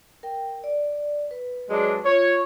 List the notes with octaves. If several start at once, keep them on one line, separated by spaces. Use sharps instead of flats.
A#4 G5
D5
B4
F#3 G#3 D4
F4 C#5